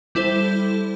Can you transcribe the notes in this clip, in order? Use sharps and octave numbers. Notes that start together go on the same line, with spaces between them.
G3 E4 A4 C5